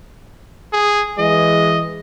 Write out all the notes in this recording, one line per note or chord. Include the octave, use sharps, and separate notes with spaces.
G#4
E3 G#3 D#5